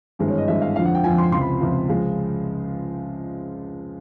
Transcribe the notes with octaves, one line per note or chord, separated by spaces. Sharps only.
G#1 G2 E3 G#3
C#5
D#5
G#1 G2 E3 G#3 E5
F5
F2 D3 F3 F5
F#5
G5
F2 D3 F3 G#5
C6
C#2 C3 F3 C6
B5
C#2 C3 F3
C#2 C#3 F3 G#3